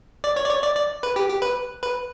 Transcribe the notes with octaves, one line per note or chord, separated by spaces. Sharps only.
D5
C#5
D5
C#5
D5
D5
B4
G4
G4
B4
B4